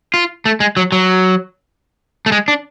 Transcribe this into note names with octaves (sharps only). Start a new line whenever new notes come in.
F4
A3
G#3
F#3
F#3
A3
G#3
D4